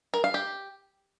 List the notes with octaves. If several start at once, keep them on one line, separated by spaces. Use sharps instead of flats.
A#4
F5
G4